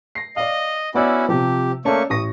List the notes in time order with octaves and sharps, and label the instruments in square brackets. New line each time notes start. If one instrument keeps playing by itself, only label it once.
[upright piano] A#6 C7
[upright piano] D5 F5 [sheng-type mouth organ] D#5
[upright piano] B3 D5 E6 [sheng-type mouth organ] C#4 E4 F#4
[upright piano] C3 F3 [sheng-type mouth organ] G4
[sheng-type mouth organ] A3 A#3 C#6 [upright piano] C#4 D5 A5
[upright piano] A1 C#6 A#6 [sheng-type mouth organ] D#6